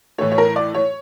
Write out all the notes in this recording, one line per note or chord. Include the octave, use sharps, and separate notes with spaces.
A2 E3 A3 C#5
C#5
A#4
D5
C#5